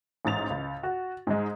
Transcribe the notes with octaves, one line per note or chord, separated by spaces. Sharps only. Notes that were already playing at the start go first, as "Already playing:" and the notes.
A1 G#2 A6 F7
C#2
F#4
G#2 G#3